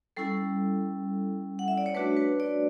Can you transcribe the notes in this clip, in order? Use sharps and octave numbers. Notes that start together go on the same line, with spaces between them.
G3 C#4 E4 A4
F#5
E5
D5
C#5
A3 D4 F#4 B4
B4
D5